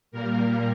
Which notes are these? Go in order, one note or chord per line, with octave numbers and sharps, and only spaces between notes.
A#2 G3 A#3 A#4